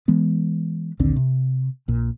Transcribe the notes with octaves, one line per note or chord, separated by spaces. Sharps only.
E3 G#3 B3
A#1 D#2 D3 C4
C3
A#1 A#2